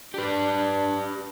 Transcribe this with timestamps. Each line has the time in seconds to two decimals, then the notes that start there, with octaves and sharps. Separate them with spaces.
0.14 D4 G4 B4